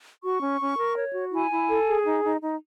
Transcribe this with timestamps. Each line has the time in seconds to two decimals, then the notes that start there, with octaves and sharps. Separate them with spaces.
0.23 F#4 C#6
0.41 C#4
0.60 C#4
0.77 A#4
0.96 C#5
1.14 F#4
1.32 E4 G#5
1.50 E4
1.69 A4
1.87 G#4
2.06 D#4
2.24 D#4
2.42 D#4